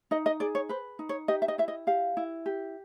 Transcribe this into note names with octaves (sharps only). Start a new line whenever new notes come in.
D#4 D#5
D#5
G#4 D5
C#5
B4 C5
D#4
C#5
G4 D#5
E5
D#5
E4 E5
D#5
G4 F5
E4
G4